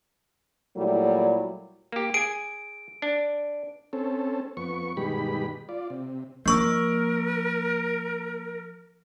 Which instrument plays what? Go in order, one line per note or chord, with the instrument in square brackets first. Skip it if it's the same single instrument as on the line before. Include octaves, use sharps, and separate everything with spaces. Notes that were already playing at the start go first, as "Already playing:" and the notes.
[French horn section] A#2 F#3 G3 A3 E4
[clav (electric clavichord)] A#3 G4
[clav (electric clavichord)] G#4 G#5 [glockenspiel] D7
[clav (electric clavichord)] D4
[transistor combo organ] C4 C#4 A4
F2 B3 C#6
G2 B2 D#3 G#3 G4 B5
F4 D5
C3
[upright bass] F3 D4 [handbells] A#3 C#6 E6 [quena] A#4